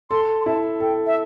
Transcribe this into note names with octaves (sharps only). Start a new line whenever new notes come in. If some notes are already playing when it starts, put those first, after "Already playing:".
A4 C6
C6
E4 A5
A4 G5
E5